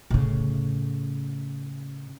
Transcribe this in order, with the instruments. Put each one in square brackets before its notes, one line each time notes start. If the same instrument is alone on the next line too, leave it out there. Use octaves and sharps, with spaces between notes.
[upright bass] A2 C#3